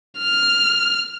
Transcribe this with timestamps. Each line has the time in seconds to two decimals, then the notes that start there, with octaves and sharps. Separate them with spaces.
0.18 F6